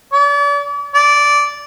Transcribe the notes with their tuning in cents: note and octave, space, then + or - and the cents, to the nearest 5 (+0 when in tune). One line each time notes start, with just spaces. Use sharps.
D5 -40
D5 -10